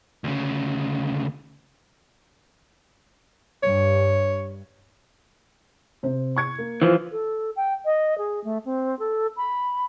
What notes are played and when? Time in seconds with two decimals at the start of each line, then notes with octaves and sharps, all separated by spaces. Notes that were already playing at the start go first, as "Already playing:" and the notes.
0.24 D2 C#3
3.63 G2 C#5
6.03 C3 C5
6.36 C#6 G#6 C#7
6.58 A#3
6.82 E3 F3
7.12 A4
7.56 G5
7.85 D#5
8.18 G#4
8.44 A3
8.65 C4
8.99 A4
9.37 B5